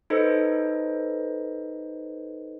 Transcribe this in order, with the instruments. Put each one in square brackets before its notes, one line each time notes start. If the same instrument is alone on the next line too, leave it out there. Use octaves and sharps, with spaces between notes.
[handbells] D#4 A4 B4 C5 D#5